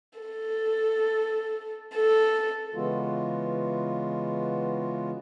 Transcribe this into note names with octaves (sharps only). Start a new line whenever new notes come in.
A4
A4
C#3 E3 G#3 B3 F4 F#4